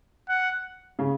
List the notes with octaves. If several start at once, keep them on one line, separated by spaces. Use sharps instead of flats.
F#5
C#3